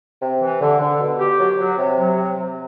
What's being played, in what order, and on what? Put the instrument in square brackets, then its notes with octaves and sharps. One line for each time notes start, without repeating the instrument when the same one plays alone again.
[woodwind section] C3
E3
D3
D3
B2
G4
F#3
F#3
C3
F#3
C3
C3